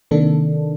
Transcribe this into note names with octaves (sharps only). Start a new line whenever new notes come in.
C3 D#3 A#3 D4 A4